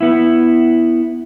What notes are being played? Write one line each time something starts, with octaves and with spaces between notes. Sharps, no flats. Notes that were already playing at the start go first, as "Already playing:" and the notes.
B3 E4